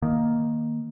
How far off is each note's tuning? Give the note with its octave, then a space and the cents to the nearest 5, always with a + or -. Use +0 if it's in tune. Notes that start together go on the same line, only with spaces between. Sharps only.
D#3 +0 A#3 +0